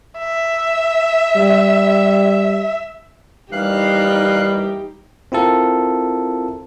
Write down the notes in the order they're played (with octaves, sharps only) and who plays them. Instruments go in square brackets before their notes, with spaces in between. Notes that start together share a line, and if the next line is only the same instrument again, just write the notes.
[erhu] E5
[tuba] G3
[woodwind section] D#2 E3 G3 [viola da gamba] D#4 G4 [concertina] F5 F#6
[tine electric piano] C4 E4 F4 A4 A#4